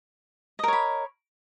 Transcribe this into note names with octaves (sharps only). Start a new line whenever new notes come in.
A#4 C#5 D#5 B5